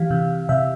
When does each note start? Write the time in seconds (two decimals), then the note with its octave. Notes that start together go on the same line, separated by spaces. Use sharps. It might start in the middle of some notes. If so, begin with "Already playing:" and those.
Already playing: E3 G4 F5
0.11 C3
0.49 C3 E5